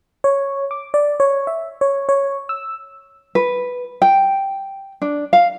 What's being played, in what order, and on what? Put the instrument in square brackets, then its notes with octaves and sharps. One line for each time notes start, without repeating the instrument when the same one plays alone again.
[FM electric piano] C#5
D6
D5
C#5
E5
C#5
C#5
E6
[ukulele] B4
G5
D4
F5